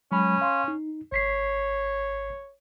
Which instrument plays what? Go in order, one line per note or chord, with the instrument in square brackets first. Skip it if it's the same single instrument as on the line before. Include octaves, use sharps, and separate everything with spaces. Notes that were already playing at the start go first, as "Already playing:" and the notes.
[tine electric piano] F#3 G#3 B5 [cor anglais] C#4
[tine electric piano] F5 C6
D#4
[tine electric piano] G#1 B6 C7 [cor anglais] C#5